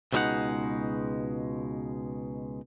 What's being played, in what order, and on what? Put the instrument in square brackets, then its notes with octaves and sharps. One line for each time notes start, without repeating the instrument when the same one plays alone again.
[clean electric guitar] C#2 B2 F#3 G#3 D#4 F#5